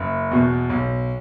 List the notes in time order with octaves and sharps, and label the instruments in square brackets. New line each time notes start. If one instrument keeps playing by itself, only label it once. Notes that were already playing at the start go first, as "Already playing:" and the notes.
Already playing: [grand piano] F#1
E2 B2
B1